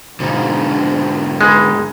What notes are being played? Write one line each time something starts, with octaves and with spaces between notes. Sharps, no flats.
G#2 B2 D3 F3 D4 D#4
G#3 D#4 B4